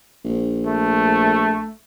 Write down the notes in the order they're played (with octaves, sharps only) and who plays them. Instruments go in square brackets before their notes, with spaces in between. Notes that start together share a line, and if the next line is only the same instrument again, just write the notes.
[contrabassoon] A#1
[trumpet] A3